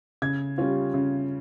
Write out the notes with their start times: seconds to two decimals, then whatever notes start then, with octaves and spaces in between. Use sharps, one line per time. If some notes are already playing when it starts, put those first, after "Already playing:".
0.22 C#3 G#6
0.58 G3 C#4 F4
0.94 C#3